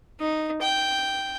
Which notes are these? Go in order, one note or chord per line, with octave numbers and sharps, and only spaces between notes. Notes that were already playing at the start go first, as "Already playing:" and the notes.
D#4
G5